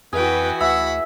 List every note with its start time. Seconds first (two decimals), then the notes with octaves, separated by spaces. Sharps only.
0.13 F2 E3 F#4 G#4 B4 G5
0.61 D2 E5 F#5 B5